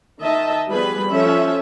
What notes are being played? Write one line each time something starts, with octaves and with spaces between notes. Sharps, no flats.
D#3 D#5 E5 A5
F3 G3 B3 G#4 B4 B5
F3 C#4 A4 E5